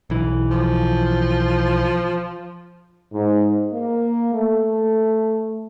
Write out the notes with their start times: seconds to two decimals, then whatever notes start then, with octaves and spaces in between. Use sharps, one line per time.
0.10 B1 E3
0.50 F3
3.13 G#2
3.73 A#3
4.34 A3